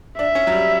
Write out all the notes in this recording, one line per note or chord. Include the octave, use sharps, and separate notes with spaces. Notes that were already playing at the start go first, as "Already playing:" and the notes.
D4 E5
C#4
F#3
G3